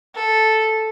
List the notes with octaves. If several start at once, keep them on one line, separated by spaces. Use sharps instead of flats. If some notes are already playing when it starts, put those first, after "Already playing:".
A4